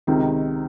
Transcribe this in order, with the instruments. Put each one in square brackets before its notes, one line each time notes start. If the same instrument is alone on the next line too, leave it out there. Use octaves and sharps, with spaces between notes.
[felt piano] C#2 C3 D#3 [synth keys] C4 D#4